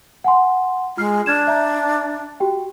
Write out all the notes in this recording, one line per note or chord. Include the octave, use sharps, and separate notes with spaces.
F#5 G#5 C6
G#3 F4 F6 C7
D4 F6 G#6 E7
E5 A#5 G6
F#4 G4 G5